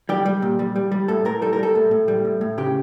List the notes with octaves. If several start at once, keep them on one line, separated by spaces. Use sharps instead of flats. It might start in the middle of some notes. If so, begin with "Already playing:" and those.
G3 G4
G3
A#2
G3
G3
G3
A2 A4
A2 A#4
G3 A4
A#4
G3 A4
A2
A2
G3
A2
A2
C#3 G4